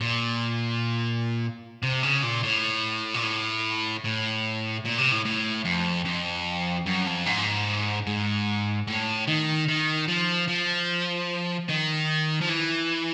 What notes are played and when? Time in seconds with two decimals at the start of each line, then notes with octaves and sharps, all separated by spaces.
0.01 A#2
1.83 C3
2.03 C#3
2.23 A#2
2.43 A2
3.14 A#2
3.23 A2
4.04 A2
4.85 A#2
4.98 C3
5.11 A2
5.25 A2
5.65 F2
6.05 F2
6.86 F#2
7.06 F2
7.26 G#2
8.07 G#2
8.88 A2
9.27 D#3
9.68 D#3
10.08 F3
10.48 F3
11.69 D#3
12.41 F3
12.49 E3